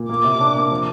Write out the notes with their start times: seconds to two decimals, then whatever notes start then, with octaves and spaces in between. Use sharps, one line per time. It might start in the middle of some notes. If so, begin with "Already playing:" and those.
Already playing: A#2
0.09 A#3 D6
0.24 C3
0.40 D4
0.55 A#3
0.71 F3